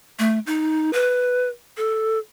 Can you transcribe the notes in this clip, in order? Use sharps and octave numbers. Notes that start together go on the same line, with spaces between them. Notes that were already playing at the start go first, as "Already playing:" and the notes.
A3
D#4
B4
A4